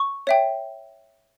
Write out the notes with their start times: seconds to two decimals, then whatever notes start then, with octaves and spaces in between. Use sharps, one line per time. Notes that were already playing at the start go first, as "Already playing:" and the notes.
Already playing: C#6
0.27 C#5 E5 G5